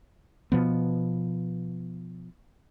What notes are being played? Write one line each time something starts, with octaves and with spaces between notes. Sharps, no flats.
B2 F3 B3